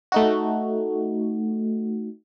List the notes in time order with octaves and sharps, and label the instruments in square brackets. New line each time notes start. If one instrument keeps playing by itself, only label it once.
[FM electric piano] A3 D#4 F#4